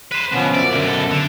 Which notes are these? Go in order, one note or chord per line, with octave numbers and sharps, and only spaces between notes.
B4 C5
B2 D3 F3 B3 C#4
F#2 D5 E5
D3 A#3
B2 A4
D3